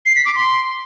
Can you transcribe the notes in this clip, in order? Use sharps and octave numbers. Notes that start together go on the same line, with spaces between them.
C7
B6
D6
C6